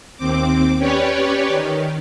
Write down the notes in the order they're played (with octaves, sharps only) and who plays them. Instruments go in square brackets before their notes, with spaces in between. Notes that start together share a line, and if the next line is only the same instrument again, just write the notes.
[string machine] D#2 C4 D6
C#4 G4 B4 C#5 D5
D#3